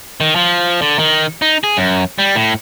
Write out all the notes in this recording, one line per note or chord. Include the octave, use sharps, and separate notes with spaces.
D#3
F3
D3
D#3
D#4
G#4
F#2
G3
A2